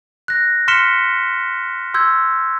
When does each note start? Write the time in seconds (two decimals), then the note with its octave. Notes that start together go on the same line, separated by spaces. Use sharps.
0.28 F#6 A#6
0.68 C6 F6 B6 C#7 E7 G7
1.94 C6 E6 G6 G#6